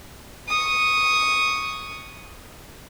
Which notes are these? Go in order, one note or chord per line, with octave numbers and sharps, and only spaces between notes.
C#6 D#6